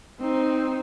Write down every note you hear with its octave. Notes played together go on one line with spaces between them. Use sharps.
C4 D#4